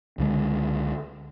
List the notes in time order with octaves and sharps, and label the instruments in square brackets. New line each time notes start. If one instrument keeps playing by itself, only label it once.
[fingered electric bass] C#2 D3 G#3